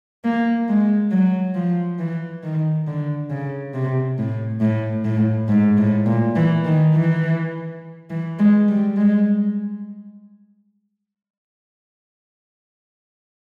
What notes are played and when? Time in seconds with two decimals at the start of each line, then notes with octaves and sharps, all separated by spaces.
0.24 A#3
0.69 G#3
1.11 F#3
1.55 F3
1.99 E3
2.43 D#3
2.87 D3
3.30 C#3
3.74 C3
4.18 A2
4.61 A2
5.05 A2
5.48 G#2
5.78 A2
6.06 A#2
6.36 E3
6.65 D#3
6.94 E3
8.10 E3
8.39 G#3
8.69 G3
8.97 G#3